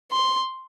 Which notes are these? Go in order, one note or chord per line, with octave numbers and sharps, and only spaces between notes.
C6